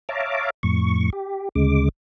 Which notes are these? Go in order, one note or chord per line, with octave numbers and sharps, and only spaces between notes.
C#5 E5 F5 A5 A#5 D6
F2 A2 C#6
G4
D2 C#3 G#3 D6